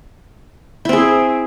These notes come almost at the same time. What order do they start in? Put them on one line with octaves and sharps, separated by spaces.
E4 C4 G#4